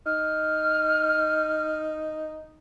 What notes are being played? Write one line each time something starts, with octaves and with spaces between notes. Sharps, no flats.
D#4 F6